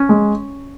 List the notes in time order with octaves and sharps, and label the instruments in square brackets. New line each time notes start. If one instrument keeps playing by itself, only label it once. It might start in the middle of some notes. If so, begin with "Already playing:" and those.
Already playing: [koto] A#3 C#4
[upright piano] G#3